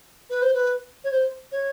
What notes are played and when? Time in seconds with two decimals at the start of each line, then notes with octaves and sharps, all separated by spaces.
0.30 B4
0.42 C5
0.54 B4
1.04 C#5
1.11 C5
1.52 C#5